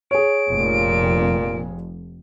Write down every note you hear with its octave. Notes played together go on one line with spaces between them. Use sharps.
G#4 C#5 D7
F1 F2 A#2